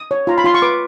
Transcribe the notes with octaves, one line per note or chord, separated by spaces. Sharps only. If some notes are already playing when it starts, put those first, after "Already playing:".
Already playing: D#6
C#5
F4 A#5
B5
F4 C6
C#6
B4 D6